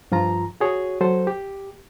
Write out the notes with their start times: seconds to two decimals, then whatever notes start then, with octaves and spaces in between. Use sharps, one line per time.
0.12 G2 F3 F4 A#5
0.61 F#4 G#4 C#5
1.01 F#3 A4 C5
1.27 G4